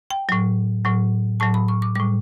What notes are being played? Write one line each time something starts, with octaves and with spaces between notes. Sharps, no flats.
G5
A2 F#3
A2 F#3
A2 F#3 A5
B5
C#6
D6
A2 G3 D6